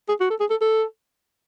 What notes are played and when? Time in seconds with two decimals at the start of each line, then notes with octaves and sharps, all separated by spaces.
0.09 G#4
0.20 F#4
0.30 A4
0.40 G#4
0.50 A4
0.61 A4